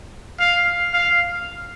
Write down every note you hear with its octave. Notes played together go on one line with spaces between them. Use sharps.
F5
F5